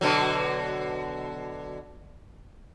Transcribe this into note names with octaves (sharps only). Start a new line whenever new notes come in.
B2 D3 F#3